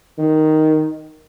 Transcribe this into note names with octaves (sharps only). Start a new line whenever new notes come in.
D#3